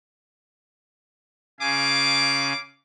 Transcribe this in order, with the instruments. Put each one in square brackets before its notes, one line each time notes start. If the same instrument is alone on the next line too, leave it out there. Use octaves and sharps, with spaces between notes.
[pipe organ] C#3 G#5 [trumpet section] F5 D6